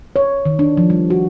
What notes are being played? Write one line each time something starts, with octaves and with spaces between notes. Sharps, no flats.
C#5
D#3
D4
F3
G3
F#4